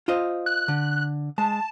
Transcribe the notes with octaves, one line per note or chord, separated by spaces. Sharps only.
F4 C5 D#5
F#6
D3
G#3 A5